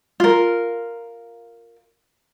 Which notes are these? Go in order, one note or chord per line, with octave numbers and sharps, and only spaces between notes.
F4 A#4